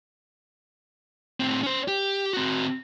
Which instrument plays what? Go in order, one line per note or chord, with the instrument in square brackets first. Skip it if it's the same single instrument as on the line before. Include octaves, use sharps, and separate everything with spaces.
[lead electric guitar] A2 C4
C#4 C5
G4
C4 F#4